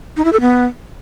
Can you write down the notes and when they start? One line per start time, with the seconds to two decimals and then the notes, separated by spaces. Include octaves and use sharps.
0.17 D#4
0.25 E4
0.33 A4
0.41 B3